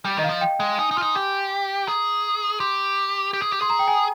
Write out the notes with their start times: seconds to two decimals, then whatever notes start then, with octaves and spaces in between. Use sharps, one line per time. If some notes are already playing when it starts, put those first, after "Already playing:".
0.05 G3
0.17 D#3 D#5
0.24 F5
0.29 F3
0.41 G5
0.60 G#3
0.79 D#4 G#5
0.91 D#4
0.96 F4 C6
1.02 D#4
1.15 G4 D6
1.87 G#4 A#5
2.60 G4 C6
3.33 G4
3.42 G#4
3.52 G4
3.61 G#4 C6
3.70 A#5
3.79 G5
3.88 G#5